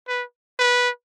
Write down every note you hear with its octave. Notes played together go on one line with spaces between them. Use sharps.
B4
B4